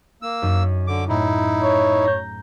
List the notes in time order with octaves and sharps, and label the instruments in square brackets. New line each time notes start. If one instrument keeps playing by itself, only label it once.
[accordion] A#3 E6
[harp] F#2 D#4
[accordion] D3 D6
[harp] A2 [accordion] D#4 E4
[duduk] C#5
[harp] A#5 G6